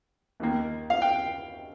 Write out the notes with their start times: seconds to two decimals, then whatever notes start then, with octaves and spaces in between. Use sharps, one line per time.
0.40 D#2 D#3 A#3
0.90 F5
1.02 G5